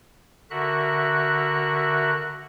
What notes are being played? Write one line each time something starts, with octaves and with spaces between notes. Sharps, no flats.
D3 F#4 A#4 E5 F#6